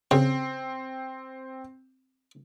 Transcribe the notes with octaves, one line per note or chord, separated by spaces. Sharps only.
C#3 C4 C#5